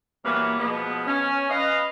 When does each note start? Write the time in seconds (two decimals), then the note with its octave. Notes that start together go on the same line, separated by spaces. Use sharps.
0.24 A#2 E3 F#3 G3 A#3 B3
0.59 B2 F3 G#3 B3
1.07 C#4
1.50 B4 D#5 F5